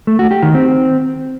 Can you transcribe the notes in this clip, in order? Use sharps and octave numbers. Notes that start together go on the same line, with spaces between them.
A3
F#4
G4
D#3
C4